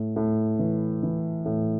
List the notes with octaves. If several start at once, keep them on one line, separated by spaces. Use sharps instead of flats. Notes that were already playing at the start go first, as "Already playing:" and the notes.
Already playing: A2
A2
E3
E3
A2